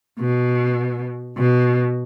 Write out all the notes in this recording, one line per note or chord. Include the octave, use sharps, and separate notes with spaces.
B2
B2